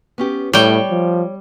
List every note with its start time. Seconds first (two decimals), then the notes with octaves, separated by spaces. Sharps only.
0.18 B3 C#4 G4
0.53 A2 G3 C#5 G5
0.91 F3